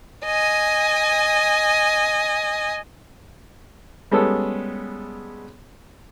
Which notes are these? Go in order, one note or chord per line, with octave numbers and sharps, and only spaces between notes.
D#5 G#5
G3 G#3 B3 C#4 A4